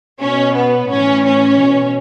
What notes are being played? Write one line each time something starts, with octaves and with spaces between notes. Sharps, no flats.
B2 C#4
B3
A2 E3 C#4
C#4
B2